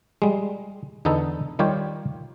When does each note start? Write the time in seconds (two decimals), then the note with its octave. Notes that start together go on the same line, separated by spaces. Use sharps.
0.22 G3 G#3
1.05 E2 D3 B3 D#4 A4
1.59 D#3 G3 F4 G4 C#5